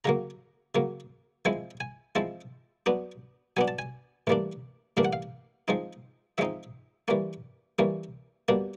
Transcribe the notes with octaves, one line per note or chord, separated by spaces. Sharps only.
C#3 F#3 A#3 A#5
C#3 F#3 A#3
F3 G#3 C4 E4 G#5
G#5
F3 G#3 C4 E4 A5
F#3 B3 D4
F#3 B3 D4 G#5
A5
G#5
A2 E3 G3 A#3 D4
A2 E3 G3 A#3 D4 F5
F#5
F5
F3 G#3 C4 D#4
F3 G#3 C4 D#4 E5
E3 G3 A#3 C#4
E3 G3 A#3 C#4
B2 G3 A#3 D4